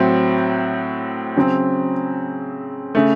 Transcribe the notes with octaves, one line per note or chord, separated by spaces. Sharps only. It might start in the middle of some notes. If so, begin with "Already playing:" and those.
Already playing: A2 F#3 C4 F#4
C#3 F#3 C4
C#3 A3